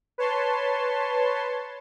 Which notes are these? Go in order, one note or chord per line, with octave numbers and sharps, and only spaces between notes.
B4 C#5 A5 C6